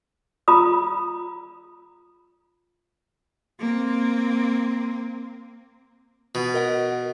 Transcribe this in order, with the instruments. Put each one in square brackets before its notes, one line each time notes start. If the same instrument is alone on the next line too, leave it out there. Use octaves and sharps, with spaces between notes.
[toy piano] F4 A#5 B5 D#6
[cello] A#3 C4
[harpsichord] B2
[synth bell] A#4 D#5 F#5